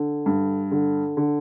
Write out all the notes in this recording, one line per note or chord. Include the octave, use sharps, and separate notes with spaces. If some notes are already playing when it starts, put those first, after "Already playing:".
Already playing: D3
G2
D3
D3